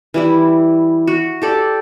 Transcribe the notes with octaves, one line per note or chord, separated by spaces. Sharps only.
E3 G3 E4
F#4
G4 A4 D5